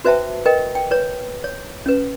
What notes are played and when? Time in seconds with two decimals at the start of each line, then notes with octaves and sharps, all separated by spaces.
0.05 F#4 B4 C5 E5 G5 A5
0.46 A#4 B4 D#5 G5
0.75 G5
0.91 B4 C#5
1.44 C#5
1.86 C#4 B4